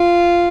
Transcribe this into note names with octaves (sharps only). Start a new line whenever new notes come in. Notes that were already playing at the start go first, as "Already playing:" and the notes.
Already playing: F4